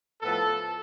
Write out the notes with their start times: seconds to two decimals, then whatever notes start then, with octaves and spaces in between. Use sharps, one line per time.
0.21 A2 F3 B3 A4